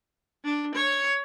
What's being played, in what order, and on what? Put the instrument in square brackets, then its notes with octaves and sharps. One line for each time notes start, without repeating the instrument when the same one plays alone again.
[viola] D4
C#5